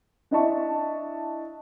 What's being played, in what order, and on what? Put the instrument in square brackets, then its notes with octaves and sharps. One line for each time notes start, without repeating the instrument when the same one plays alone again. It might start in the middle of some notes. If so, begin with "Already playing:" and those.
[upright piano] D4 E4 D#5 E5 A5 C#6